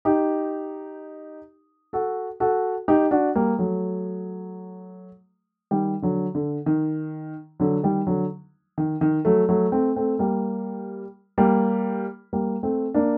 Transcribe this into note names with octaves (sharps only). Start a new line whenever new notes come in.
D#4 G4
F#4 A4
F#4 A4
D#4 G4
D4 F#4
G3 A#3
F#3 A3
D#3 G3
D3 F#3
D3
D#3
D3 F#3
D#3 G3
D3 F#3
D#3
D#3
F#3 A3
F#3 A3
A3 C4
A3 C4
G3 A#3
G3 A#3
G3 A#3
A3 C4
A#3 D4